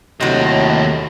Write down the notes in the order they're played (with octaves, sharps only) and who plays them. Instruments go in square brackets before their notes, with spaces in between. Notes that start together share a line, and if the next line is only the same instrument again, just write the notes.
[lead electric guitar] D#2 D#5 [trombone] A2 [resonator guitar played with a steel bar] C3 F#3